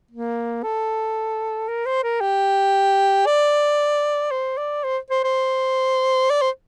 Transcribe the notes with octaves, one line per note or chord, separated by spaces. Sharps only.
A#3
A4
A#4
C5
A#4
G4
D5
C5
D5
C5
C5
C5
D5
C5